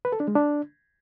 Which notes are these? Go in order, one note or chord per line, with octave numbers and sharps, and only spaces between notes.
B4
A4
D4
G#3
D4